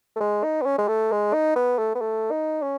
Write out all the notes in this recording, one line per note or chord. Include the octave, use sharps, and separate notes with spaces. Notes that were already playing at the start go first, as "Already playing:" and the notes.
A3
G#3
D#4
B3
C#4
G#3
A3
G#3
D#4
B3
A3
B3
A3
D#4
C#4